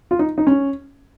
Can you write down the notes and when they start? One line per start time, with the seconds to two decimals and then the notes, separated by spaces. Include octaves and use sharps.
0.11 F4
0.19 D#4
0.38 D#4
0.47 C#4